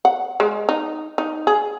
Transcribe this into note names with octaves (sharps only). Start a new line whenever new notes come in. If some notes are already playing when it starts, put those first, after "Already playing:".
F#5
G#3
D#4
D#4
G#4